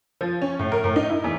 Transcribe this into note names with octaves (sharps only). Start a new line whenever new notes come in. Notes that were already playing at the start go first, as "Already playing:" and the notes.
F3
C#4
A2
A#4
A2
D#4
E4
E2